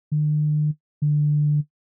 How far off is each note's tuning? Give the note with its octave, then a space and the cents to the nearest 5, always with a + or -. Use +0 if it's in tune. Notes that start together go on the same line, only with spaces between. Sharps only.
D3 +45
D3 +15